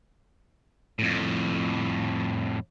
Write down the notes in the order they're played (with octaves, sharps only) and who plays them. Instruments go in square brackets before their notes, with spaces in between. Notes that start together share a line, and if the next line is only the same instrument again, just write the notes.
[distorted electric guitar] F2 A2